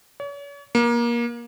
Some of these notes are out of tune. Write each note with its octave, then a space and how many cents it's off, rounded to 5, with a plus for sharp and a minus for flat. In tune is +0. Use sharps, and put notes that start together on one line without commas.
C#5 +40
A#3 +25